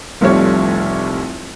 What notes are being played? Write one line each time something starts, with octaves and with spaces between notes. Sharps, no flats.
F1 C2 F3 G3 A3 C#5